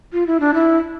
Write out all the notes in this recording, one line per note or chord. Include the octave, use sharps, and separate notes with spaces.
F4
E4
D4
E4